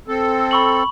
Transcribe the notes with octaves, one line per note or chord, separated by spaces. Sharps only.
C4 A4
B5 C#6 F#7